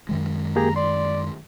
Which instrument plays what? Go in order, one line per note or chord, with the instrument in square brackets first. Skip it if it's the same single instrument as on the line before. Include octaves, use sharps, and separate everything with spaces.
[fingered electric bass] F#2 D#3 G#3
[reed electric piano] A#3 G4 G#4 [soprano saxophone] A#5
[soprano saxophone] D5 [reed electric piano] C6